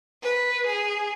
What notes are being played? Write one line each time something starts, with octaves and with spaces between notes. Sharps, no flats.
B4
G#4